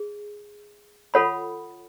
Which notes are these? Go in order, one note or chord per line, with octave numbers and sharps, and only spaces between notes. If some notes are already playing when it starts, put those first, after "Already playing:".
Already playing: G#4
F4 A4 C#5 F#5 B5